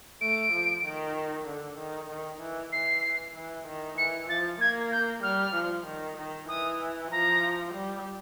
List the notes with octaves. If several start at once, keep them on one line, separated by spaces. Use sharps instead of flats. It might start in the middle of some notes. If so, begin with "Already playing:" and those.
A3 D7
F3
D#3
D3
D#3
D#3
E3
E3 C7
E3
D#3
E3 C#7
F3 A6
A#3 G#6
G6
G3 F6
F3
D#3
D#3
E3 D#6
F3 A#5
G3